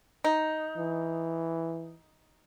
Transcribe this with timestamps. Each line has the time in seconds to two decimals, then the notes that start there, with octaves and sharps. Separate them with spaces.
0.24 D#4
0.78 E3